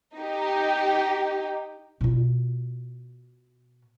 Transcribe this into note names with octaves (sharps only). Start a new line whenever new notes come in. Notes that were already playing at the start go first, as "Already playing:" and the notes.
D#4 G4
B2 F4